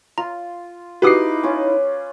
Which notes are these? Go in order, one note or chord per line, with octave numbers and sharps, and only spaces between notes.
F4 A#5
D#4 E4 F#4 G4 B4 D6 D#6 C7
C#4 F4